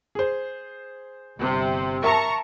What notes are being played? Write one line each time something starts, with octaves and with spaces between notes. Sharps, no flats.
G#4 C5
G1 C3
A#4 E5 A5 A#5 C#6